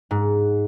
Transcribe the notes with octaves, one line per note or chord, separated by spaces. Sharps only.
G#2